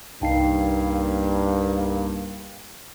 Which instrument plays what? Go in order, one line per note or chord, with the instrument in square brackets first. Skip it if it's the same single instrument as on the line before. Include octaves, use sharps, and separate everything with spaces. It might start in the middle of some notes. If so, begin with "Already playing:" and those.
[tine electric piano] C2 D#4 C7 [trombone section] G2 A#3 [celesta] F5 G5 A5